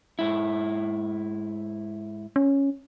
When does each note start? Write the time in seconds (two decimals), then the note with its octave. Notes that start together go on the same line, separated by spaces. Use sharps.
0.19 G#2 E4
2.36 C#4